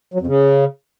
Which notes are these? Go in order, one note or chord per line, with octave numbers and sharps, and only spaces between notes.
F#3
F2
C#3